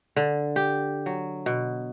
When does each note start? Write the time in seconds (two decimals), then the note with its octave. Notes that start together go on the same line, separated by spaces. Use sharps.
0.16 D3
0.56 G4
1.06 F#3
1.46 B2